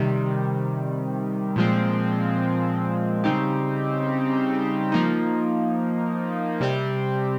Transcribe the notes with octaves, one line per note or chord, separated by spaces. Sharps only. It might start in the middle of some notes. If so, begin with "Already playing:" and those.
Already playing: C3 D#3 G3
A#2 F3 G#3 C4
C#3 G3 C4 D#4 G4
F3 A#3 D#4
C3 G3 C4 G4